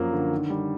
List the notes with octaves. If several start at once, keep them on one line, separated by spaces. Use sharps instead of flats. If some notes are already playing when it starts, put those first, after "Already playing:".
Already playing: F#2 F3 A#3
D3
D#3
G3